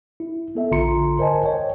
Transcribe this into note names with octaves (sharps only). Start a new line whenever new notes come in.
E4
B3 A4 E5
A#1 D3 F4 A#5 C6 C#7
A#4 C5 D#5 G#5 A5
C#5 D#5 G5